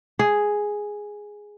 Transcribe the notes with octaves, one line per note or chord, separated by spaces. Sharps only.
G#4